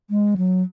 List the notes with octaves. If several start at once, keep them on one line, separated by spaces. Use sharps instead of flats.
G#3
F#3